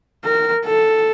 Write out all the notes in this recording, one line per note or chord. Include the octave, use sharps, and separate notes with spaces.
A#4
A4